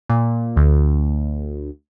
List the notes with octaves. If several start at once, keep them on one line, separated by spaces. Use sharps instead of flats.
A#2
D2